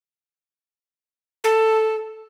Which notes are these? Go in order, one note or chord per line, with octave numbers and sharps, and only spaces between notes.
A4